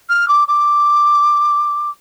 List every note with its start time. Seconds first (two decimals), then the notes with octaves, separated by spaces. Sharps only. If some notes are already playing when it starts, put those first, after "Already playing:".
0.09 F6
0.28 D6
0.48 D6